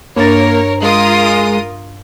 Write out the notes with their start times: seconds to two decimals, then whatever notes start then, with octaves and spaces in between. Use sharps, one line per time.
0.17 G2 A#3 D4 A#4 C#5 A6
0.82 G#3 F4 A#4 D#6